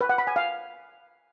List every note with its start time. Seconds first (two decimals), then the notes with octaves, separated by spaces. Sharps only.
0.01 B4
0.09 F#5
0.18 B5
0.27 G#5
0.36 F5